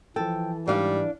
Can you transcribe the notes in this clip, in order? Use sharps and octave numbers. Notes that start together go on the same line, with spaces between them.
E3 F3 A4 G5
G#2 G3 D4 F5